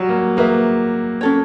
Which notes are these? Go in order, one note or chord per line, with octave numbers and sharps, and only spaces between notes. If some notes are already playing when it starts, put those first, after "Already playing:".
Already playing: F#3 G3
A#3
A#3 G#4 B4 E5
C#4 F#4 A4 C#5